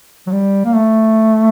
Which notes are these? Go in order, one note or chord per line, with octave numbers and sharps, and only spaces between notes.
F#3
G3
A#3
A3